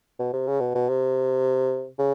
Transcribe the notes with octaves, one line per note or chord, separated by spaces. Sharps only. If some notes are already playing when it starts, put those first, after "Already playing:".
B2
C3
C#3
B2
B2
C3
C#3